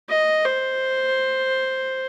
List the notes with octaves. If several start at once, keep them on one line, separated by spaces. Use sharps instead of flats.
D#5
C5